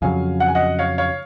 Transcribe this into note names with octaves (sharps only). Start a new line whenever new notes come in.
F2 C#3 F#3 F5 G#5
F#5
G#5
D#5 F#5
C#5 F5
C#5 F5